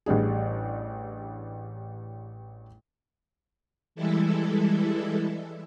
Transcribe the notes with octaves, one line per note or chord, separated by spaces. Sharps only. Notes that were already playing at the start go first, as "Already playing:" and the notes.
A1 G3 D4 G#4
E3 G3 G#3 E4 A4